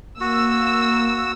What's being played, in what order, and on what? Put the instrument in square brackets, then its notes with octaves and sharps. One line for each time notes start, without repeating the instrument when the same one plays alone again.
[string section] A#3 E6 [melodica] F#4